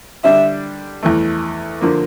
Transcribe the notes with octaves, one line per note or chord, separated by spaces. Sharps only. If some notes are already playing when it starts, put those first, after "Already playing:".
D3 G3 D4 E5
E2 E3 A3
D3 F3 A#3